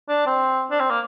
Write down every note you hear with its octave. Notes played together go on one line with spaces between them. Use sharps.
D4
C4
D4
C4
A#3